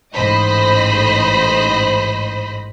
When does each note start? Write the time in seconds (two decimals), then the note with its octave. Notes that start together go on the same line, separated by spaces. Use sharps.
0.14 A1 G#2 C5 D#5 B5